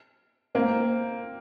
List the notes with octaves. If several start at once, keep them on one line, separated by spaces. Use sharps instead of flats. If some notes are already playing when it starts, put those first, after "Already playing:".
A#3 C4